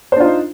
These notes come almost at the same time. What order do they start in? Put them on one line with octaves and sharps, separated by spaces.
C5 D4 F4 D#4